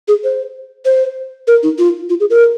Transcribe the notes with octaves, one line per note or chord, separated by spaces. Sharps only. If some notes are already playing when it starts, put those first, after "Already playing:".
G#4
C5
C5
A#4
D#4
F4
F4
G#4
A#4